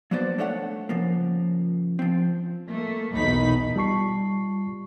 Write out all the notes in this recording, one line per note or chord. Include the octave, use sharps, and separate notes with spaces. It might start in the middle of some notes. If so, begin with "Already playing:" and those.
F#3 A#3 B3 D4 C5 D5
A3 D4 A4 C#5 D#5 F#5
C#3 F3 A#3
F3 C4
A3 A#3
B1 E2 D#4 B5 B6
G3 F4 A5 C#6 C7